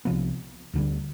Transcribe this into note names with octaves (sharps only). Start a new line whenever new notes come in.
C2 C3 F3 B3
D2 D3 G3